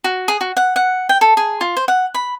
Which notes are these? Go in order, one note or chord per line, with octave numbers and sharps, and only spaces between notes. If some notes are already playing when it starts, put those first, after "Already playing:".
F#4
G#4
F#4
F#5
F#5
G5
A4
G#4
F4
C5
F#5
B5